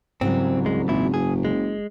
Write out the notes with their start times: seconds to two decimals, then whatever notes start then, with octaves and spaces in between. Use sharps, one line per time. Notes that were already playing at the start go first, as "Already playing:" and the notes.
0.21 C2 G#2 C#3 F#3 C4
0.65 C#2 G#3
0.88 G#1 A#2 E4
1.14 F#1 G#4
1.45 G#3